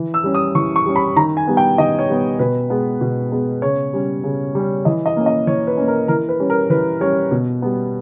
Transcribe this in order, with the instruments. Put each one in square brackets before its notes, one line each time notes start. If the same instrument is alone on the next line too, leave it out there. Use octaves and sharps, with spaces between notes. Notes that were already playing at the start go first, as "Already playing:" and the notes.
Already playing: [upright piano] E3
E6
G3 C#4
D#6
E3 C#6
C#6
G3 C#4
B5
D#3 A#5
G#5
G3 B3
G5
D#3 D#5
C#5
G3 B3
B2 B4
G#3 B3
B2
G#3 B3
C#3 C#5
G3 C#4
C#3
G3 C#4
E3 D#5
D#5
A#3 C#4
D#5
E3 C#5
B4
A#3 C#4
A#4
E3 A#4
B4
G3 C#4
A#4
E3 B4
G3 C#4 C#5
B2
G3 B3